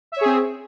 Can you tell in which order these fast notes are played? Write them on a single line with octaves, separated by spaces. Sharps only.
E5 C#5 G#4 C4